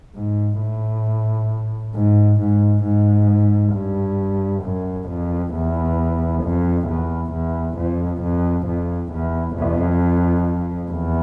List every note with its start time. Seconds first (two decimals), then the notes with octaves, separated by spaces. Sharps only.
0.15 G#2
0.60 A2
1.95 G#2
2.40 G#2
2.84 G#2
3.74 G2
4.63 F#2
5.09 F2
5.54 E2
6.43 F2
6.88 E2
7.33 E2
7.77 F2
8.22 F2
8.67 F2
9.12 E2
9.56 F2
10.91 E2